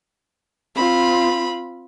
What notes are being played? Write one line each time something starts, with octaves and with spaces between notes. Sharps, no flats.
C4 F4 B5